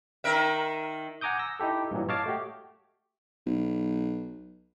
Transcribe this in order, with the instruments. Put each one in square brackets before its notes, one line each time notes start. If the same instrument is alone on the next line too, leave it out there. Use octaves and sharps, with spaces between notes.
[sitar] D#3 A#4 E5
[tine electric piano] F#5 G#5 A#5 D6 D#6 G6
E6 A#6
D#4 E4 G4 A4
G2 A#2 E3 F#3
C#5 D#5 F5 A5 D6
A3 F#4 G4
[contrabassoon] B1